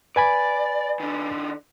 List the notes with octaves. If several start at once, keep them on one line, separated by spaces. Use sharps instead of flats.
B4 D5 G#5 B5
D#3 D4